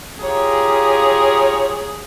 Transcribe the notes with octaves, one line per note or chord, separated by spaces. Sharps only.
F4 G4 G#4 C#5 A#5